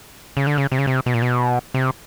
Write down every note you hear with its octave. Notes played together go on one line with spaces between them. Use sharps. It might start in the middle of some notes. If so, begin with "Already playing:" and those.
C#3
D3
C#3
C3
C#3
C3
B2
A#2
B2
C3